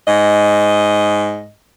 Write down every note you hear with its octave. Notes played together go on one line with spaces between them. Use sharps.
G#2 D#5